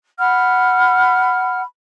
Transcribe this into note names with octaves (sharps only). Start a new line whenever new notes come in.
F#5 B5 F6